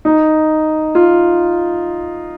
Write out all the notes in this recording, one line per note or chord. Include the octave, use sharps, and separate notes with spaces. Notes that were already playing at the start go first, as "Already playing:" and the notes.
D#4
F4